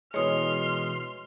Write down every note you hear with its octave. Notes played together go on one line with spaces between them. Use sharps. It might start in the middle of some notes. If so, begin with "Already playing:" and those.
B2 E3 G#3 C#5 C6 D#6 F6